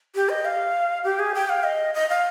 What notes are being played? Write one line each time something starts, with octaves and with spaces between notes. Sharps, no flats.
G4
D#5
F5
G4
G#4
G5
F5
D#5
D#5
F5